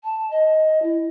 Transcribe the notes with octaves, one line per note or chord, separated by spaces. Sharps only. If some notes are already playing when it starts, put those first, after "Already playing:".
A5
D#5
E4